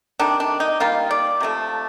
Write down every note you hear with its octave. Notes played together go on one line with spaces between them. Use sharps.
C3 D#3 A3 D4
D4
D#4
D#3 G3 A#3 F4
D5
C3 F3 A3